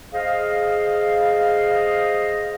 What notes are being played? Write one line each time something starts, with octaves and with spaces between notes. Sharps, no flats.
G#4 C5 D#5 F5